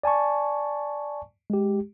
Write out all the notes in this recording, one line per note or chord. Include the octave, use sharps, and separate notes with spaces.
D5 G#5 A5 C#6
G#3 G4